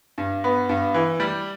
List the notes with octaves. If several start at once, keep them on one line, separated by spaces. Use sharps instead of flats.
G2
B3
G2
E3
G3